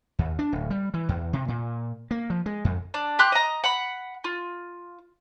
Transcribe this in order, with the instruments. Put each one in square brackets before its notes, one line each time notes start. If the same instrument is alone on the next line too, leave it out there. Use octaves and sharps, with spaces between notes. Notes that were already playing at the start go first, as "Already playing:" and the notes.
[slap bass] D#2
D4
D1
G3
E3
E2
C3
A#2
A#3
F3
G#3
F2
[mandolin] D4
G4 C6 F#6
D#5 A#5
F#5 B5
F4